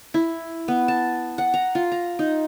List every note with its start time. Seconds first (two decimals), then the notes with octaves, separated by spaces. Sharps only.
0.14 E4
0.68 B3
0.88 A5
1.38 F#5
1.54 A#5
1.75 F4
1.92 A#5
2.19 D#4